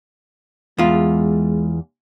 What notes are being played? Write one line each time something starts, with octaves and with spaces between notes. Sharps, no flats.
E2 G#3 F4